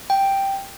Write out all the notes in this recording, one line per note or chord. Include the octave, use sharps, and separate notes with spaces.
G5